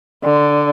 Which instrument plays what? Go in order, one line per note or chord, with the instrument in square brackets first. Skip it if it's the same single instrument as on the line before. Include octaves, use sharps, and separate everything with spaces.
[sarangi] D3